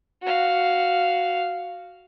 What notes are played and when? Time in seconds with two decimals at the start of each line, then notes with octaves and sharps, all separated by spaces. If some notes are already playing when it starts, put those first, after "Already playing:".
0.23 F#4 F5